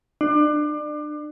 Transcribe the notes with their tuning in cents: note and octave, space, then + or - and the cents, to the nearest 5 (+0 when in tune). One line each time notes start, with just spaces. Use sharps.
D4 +30